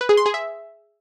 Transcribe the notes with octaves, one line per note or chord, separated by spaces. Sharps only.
B4
G#4
C6
G#4
E5